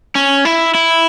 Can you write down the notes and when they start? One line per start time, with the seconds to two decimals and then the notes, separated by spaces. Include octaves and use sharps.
0.15 C#4
0.45 E4
0.74 E4